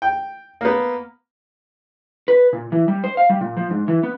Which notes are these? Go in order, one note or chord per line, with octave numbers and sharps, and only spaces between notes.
G5
A#3 B3
B4
A#2
E3
G3
C5
F5
G3
A#2
F3
G#2
E3
B3